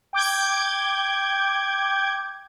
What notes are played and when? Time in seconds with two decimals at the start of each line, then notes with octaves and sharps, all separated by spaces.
0.13 G5 D6 G6 G#6